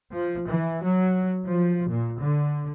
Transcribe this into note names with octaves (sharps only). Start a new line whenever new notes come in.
F3
E3
F#3
F3
A#2
D3